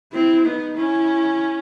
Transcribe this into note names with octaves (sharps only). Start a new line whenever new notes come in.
C4 E4
B3 D#4
C#4 E4